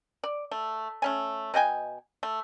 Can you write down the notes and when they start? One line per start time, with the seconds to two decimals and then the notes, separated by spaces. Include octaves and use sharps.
0.24 D5
0.51 A3
1.02 A3 C#4 G#5
1.54 B2 D#5 G5 G#5
2.23 A3